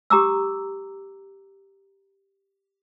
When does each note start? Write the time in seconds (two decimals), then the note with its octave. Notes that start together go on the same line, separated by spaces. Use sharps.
0.10 G4 A#5 D6 E6